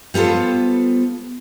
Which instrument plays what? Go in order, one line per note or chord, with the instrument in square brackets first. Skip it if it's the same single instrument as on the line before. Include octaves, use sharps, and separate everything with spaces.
[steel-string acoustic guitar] G3 B3 F4 A4 C5